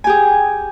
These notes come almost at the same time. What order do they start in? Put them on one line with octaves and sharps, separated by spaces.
G#5 G4 G#4